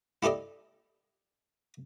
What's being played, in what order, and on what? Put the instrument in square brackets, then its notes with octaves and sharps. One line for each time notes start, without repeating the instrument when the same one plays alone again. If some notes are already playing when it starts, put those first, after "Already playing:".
[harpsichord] E4 G4 A4 D5 D#5